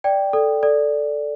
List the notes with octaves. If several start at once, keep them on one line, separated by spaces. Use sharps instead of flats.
D5 G5
A4 D5
A4 D5